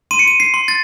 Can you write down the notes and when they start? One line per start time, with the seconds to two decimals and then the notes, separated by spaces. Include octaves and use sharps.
0.11 C6 D#7
0.19 C#7
0.28 D#7
0.40 C7
0.54 C6
0.68 A6